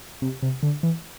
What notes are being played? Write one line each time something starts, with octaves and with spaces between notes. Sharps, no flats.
C3
C3
D3
E3